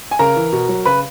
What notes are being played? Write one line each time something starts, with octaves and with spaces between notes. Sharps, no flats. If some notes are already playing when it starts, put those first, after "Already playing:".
G#5
C#3 A#4 A#5
E3
B2
F#3
C#3 B4 B5